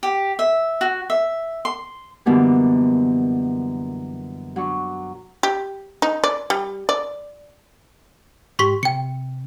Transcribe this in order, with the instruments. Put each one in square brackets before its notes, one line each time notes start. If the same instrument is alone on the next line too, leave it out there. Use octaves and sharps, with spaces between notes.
[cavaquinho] G4
E5
F#4
E5
C6
[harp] F#2 B2 D3 E3 G3 A#3
F#3 D4 C#6
[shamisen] G4
D#4
D5
G3
D5
[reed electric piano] G#2 G4 [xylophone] C6 C#6 B6
[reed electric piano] C3 [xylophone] G5 C#7